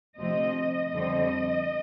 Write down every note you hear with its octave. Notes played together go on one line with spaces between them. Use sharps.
D2 C3 F3 C4 D#5
F2 D3 G3 C4 D#5